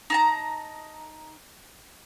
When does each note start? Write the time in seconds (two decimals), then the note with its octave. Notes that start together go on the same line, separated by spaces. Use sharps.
0.10 D#4 A5 A#5